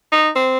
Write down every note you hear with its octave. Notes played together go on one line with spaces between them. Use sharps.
D#4
C4